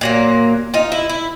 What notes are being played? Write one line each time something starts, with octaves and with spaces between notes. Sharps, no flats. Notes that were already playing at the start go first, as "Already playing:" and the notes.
A#2 F#3 A#3
D#4 F4
E4
E4